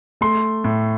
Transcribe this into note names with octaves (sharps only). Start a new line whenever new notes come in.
A3 C6
A2